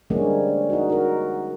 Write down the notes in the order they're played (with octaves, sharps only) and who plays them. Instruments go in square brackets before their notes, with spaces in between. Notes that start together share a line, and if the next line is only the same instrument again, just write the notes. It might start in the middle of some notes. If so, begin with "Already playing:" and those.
[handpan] D3 F3 G3 G#3 A#3 C#4
D#4 F#4
F#4 A#4